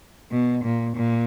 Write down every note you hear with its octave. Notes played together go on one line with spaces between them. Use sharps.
B2
A#2
A#2